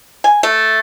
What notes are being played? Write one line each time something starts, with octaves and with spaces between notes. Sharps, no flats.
G#5
A3